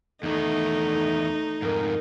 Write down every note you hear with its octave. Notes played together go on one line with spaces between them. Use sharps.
E2 D#3 A3 D#4
F2 G#2 A#4